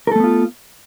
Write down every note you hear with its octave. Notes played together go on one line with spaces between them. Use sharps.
A3 B3 F4 A4 A#4